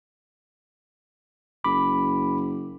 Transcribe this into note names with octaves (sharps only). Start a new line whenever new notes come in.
F#1 B5 D6